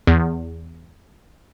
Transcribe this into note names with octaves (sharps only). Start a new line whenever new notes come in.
E2